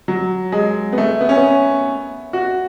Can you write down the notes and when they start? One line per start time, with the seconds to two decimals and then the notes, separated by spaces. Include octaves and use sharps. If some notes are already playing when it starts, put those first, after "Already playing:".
0.08 F#3
0.52 G#3
0.93 B3
0.98 A3
1.21 B3
1.29 C#4
1.36 B3
2.33 F#4